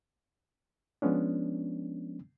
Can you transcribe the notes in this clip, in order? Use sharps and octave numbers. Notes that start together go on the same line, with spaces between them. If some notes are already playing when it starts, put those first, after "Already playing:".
F3 G#3 B3 C#4 D4